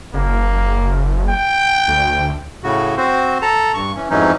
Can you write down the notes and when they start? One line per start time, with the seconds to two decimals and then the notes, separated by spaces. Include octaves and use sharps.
0.14 F#1 A#3
1.29 G5
1.88 D2
2.63 A2 C#3 F#4
2.97 C4 F#4 C5
3.42 A4 A5 A#5
3.74 G2 C#6
3.95 E3 C#4
4.10 F2 G#2 E3 F#3 C#4 D#4